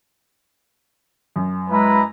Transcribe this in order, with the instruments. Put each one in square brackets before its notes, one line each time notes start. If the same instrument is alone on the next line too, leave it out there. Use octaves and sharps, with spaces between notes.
[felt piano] F#2
[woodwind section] G#3 [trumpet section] E4 B4 A#5